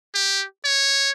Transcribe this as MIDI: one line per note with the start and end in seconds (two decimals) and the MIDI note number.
0.15 0.45 67
0.64 1.11 73